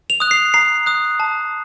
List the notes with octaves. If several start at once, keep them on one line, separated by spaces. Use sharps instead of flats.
F7
D#6 F#6
C7
A#5 C7
D#6 F#6
A5